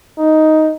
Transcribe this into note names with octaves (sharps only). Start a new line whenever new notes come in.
D#4